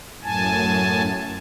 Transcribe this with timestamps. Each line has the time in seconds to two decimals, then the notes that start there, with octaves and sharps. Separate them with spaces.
0.23 F#2 A2 G#5 A5